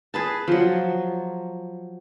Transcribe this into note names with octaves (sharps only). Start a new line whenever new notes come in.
G#4 B4 A5
F3 F#3